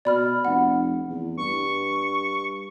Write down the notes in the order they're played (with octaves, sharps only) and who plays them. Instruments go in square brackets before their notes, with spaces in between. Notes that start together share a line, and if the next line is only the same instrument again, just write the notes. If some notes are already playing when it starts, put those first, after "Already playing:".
[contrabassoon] B2 [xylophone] D5 B5 F6
[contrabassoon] F1 [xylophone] F#5
[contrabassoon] E2
[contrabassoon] G2 [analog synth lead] C#6